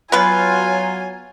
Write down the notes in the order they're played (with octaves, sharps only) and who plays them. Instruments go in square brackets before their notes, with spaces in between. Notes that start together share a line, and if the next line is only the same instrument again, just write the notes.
[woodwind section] F#3 F4 [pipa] B3 B4 [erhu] G#5